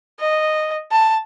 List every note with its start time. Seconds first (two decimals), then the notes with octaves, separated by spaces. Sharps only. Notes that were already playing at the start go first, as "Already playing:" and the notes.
0.20 D#5
0.92 A5